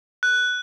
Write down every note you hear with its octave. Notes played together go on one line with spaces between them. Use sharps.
F#6